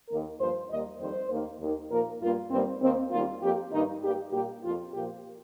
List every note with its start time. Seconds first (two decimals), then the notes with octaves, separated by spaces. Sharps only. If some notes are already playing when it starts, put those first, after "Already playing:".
0.08 D#2 D#3 A#3 A#4
0.38 G2 F3 A#3 C5
0.69 D#2 D#3 G3 A#3 D#5
0.99 F2 D#3 G3 C5
1.30 D#2 D#3 A#3
1.59 D#2 D#3 A#3
1.90 A#2 F3 A#3 A#4
2.20 G2 G3 A#3 F4
2.50 G2 D#3 G3 A#3 C4
2.81 D#2 D#3 A#3 C4
3.11 D#2 D#3 G3 A#3 F4
3.42 F2 F3 A#3 G4
3.72 G2 D#3 A#3 D#4
4.02 G2 G3 A#3 G4
4.32 A#2 G3 A#3 G4
4.63 F2 F3 A#3 F4
4.93 A#2 F3 A#3 G4